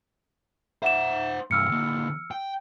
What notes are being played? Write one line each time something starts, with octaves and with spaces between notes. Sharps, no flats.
C5 E5 F#5 E7
C2 G2 E6 F6 C#7
D3 A#3
G5